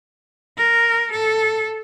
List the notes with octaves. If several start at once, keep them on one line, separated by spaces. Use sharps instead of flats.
A#4
A4